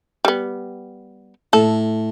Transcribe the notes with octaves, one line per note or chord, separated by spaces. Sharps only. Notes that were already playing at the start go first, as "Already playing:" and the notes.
G3 B3
A2 A4